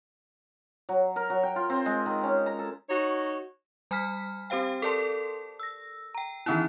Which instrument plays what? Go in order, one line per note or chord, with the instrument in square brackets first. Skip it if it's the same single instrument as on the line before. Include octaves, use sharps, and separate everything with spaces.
[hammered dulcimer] F#3
A#4
F#3
G5
F4
C4
G#3
D#3
C#4
A#5
A4
[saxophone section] D#4 F#4 C#5
[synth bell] G3 G#5 B5 F6 B6
C4 G4 C5 F5 G5
A4 A#4 D5 A5 C6
E6 A#6
G5 A#5
D#3 E3 B3 C#4 D#4 E4